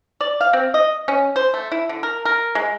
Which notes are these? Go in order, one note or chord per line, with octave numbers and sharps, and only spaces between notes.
D5
F5
C4
D#5
C#4
C5
A3
E4
D3
A#4
A#4
G#3